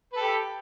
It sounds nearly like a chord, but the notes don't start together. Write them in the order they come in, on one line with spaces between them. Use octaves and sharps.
B4 A4 G4